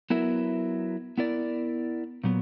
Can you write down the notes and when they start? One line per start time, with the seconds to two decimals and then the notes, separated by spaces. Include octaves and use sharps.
0.10 F#3 B3 E4 A#4 E5
1.18 B3 E4 A#4 D5
2.24 A#2 F#3 B3